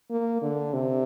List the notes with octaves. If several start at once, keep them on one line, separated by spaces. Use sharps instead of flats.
A#3
D3
C3